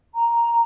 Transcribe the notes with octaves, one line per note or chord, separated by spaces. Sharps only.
A#5